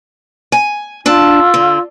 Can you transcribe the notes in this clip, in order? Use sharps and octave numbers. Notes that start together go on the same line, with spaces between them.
G#5
D4 F4 A5 E6
D3